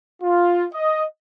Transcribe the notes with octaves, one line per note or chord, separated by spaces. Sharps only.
F4
D#5